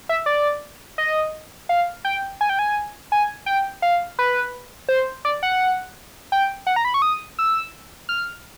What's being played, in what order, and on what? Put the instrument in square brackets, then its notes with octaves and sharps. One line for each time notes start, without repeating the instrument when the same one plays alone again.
[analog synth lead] E5
D5
D#5
F5
G5
G#5
G5
G#5
G#5
G5
F5
B4
C5
D5
F#5
G5
F#5
A#5
B5
C#6
D#6
E6
F6